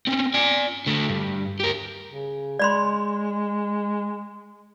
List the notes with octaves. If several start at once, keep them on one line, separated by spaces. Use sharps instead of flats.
C4 C#4
D5 G#5
D3 A3
G2
G4 A#4
C#3
G#3 D5 B5 C6